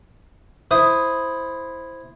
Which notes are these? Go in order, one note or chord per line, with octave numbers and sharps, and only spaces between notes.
E4 C5 D#6